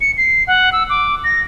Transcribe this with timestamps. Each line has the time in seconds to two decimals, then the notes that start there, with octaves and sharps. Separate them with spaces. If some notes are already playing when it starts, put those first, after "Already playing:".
0.01 C#7
0.18 C7
0.47 F#5
0.72 E6
0.90 D6
1.24 A#6